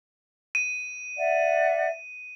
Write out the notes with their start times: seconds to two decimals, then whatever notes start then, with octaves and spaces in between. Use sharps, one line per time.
0.55 D#7
1.17 D5 E5 F#5